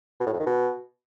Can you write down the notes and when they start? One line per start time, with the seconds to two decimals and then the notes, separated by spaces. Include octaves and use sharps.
0.20 B2
0.27 A2
0.33 F2
0.40 D#3
0.46 B2